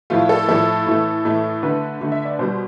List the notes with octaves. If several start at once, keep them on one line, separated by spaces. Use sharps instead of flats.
A2 F3 A3 F4
A4
A2 F3 A3 A4
A2 E3 A3
A2 E3 A3
D3 A3 B4
D3 A3
E5
D5
B2 G3 C5